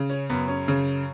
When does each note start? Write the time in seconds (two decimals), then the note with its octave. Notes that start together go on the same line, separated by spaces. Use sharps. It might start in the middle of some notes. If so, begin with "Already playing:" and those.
Already playing: C#3
0.10 C#4
0.30 F#2 B3
0.48 C#4
0.68 C#3